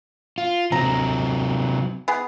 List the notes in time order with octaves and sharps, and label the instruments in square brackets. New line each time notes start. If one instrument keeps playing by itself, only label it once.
[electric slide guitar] F4
[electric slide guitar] C3 F#3 C4 [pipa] A#5
[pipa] B3 G#4